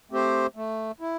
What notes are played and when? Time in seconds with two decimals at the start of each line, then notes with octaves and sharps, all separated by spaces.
0.11 A3 C4 G4 C5
0.56 A3
1.00 E4